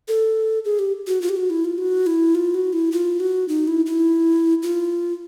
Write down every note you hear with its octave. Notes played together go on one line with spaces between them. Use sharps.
A4
G#4
G4
F#4
F4
G4
F#4
E4
F4
F#4
E4
F4
F#4
E4
F4
F#4
D#4
E4
E4
F4